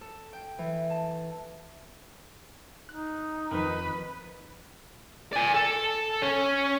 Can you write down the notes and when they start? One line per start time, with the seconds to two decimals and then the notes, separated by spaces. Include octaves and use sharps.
0.01 A4
0.33 G5
0.59 E3
0.90 A5
2.89 D#4 F#6
3.51 F2 D#3 F3 B4
5.33 D5 G#5
5.54 A4
6.22 C#4